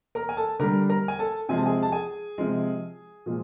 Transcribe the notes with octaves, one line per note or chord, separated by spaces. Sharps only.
A#4 A#5
G#5
A4 A5
D3 G3 A#4 A#5
A#4 A#5
G#5
A4 A5
C3 F3 G#3 G#5
A5
G#4 G#5
A5
G#4 G#5
C3 F3 G#3
A#2 F3 G#3